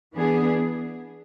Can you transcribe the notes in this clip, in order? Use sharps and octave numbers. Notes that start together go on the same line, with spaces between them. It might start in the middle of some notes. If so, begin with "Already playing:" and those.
E3 B3 D4 G#4